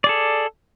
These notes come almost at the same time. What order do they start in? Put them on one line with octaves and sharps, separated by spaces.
D5 G#4 A4